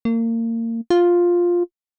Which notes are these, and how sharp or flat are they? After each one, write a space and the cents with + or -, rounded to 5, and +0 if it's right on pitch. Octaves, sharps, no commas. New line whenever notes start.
A#3 -30
F4 +5